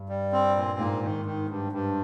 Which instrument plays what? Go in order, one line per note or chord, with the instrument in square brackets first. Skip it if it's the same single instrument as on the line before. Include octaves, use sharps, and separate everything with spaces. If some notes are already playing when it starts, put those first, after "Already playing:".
Already playing: [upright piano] G2
[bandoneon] G3
C4
A#2
[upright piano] G#2 [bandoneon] A#3
[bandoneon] D#3
D#3
G2
G2